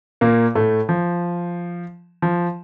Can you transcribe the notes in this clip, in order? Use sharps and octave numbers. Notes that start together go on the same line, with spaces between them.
A#2 A#3
A2 A3
F3
F3